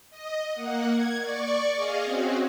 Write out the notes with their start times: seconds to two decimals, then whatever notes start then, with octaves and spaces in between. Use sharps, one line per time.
0.10 D#5
0.53 A#3 F#5
0.88 G#6
1.20 D5 C#6
1.75 G#4 D#5 F5
2.05 C4 C#4 F#4